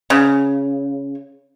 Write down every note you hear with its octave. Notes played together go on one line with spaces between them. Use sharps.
C#3